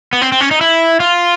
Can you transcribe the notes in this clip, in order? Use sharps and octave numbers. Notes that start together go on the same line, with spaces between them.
B3
C4
C4
C#4
D#4
E4
F4